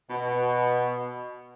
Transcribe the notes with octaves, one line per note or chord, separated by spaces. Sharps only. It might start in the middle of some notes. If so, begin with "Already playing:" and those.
B2